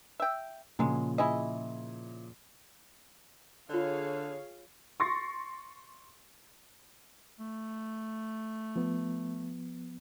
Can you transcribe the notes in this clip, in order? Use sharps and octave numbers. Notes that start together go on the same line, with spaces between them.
E5 G5
A#2 C#3 F3 F#3 G#3
E4 G#4 D#5
D3 F4 G#4 C#5 D5 F5
C6 C#6 A6 A#6
A3
F3 B3